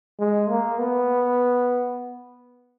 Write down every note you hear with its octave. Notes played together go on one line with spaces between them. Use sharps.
G#3
A#3
B3